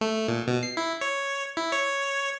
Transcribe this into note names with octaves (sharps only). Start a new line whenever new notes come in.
A3
A#2
B2
C7
E4
C#5
E4
C#5